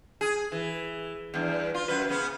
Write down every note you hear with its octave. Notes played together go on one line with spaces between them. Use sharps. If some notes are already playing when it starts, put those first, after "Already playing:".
G#4
E3
E2 G2
F4
F#2 B4
C#3 B3